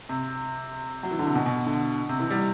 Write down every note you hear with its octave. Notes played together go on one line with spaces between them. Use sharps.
C3
F#3
E3
D3
C3
B2
B2
D3
C3
E3
G3